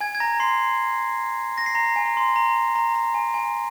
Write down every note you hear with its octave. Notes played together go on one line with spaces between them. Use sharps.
G#5 G#6
G#6
A#5 A#6
C6 C7
A#6
C7
A#5 A#6
G#5
A#5
C6
A#5
A#5
A#5
A#5
G#5
G#5